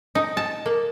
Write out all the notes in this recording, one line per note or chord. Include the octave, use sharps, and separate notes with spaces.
D#4
A5
A#3